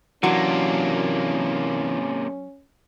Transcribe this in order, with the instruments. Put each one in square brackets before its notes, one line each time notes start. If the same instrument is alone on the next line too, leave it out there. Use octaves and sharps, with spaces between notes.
[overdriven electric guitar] C3 A#3 [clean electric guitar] E3 D4 [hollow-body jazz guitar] F#3 F#4 [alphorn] C#4